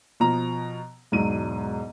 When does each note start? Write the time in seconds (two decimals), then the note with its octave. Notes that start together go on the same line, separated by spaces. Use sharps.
0.20 B2 F3 A#5
1.12 E1 G#2 F#3 D#7